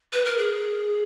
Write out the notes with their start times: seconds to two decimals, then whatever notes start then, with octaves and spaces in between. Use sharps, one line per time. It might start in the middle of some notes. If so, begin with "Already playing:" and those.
0.13 B4
0.25 A#4
0.38 G#4